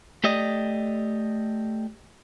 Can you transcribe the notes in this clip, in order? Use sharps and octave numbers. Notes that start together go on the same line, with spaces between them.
A3 G4 D5 D#5